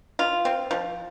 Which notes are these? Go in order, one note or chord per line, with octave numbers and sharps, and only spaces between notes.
F4
C4
F3